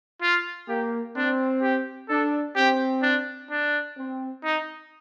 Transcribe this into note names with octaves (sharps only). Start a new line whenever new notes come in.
F4
A#3 G4
C4 D4
G4
D4 A4
C4 G4
D4
D4
C4
D#4